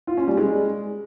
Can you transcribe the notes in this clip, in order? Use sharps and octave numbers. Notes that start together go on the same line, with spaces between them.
F4
C#4
G3
G#3